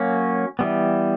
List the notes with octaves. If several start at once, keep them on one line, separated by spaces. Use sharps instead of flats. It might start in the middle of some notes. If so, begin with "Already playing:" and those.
Already playing: F#3 A#3 C#4
E3 G3 B3